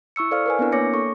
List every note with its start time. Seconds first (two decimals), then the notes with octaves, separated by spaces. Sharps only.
0.16 E4 C#6 E6 C#7
0.31 A4 C5 D5 F5 F6
0.46 A#4 B4 G#5
0.59 B3 C4 D4 E4 A#4
0.72 A#3 C#5 D6 A#6 C#7
0.94 A4 C#6